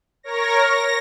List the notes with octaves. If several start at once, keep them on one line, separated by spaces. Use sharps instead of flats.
A#4 C#5 A#6
A#6